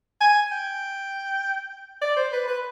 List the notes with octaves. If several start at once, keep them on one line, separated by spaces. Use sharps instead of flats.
G#5
G5
D5
C5
B4
B4